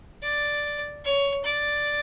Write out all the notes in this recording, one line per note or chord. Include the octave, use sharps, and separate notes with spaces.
D5
C#5
D5